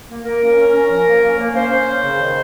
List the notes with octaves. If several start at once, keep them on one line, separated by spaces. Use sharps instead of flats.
A#3
A#3 A#4
C#4
C#4
C#4
F3
A#3
C#4
A#3
C#4 C5
A#3
C#4
C#3
D#3